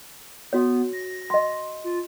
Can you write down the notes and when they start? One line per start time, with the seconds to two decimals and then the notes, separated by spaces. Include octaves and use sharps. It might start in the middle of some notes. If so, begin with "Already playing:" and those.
0.53 B3 F#4 C#5
0.93 A#6
1.30 D#5 C6
1.84 F4